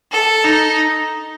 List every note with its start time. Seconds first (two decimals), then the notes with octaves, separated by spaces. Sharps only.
0.12 A4
0.44 D#4